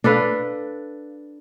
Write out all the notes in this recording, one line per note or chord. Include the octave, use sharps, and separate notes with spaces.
D4 A4 B4 F5